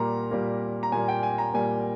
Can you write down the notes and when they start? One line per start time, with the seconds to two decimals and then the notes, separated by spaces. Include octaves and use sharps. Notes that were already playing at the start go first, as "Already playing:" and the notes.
Already playing: A#2 G3 A#3 A#5
0.31 A#2 G3 A#3
0.83 A#5
0.92 A#2 G3 A#3 G#5
1.08 G5
1.23 G#5
1.38 A#5
1.54 A#2 G3 A#3 G#5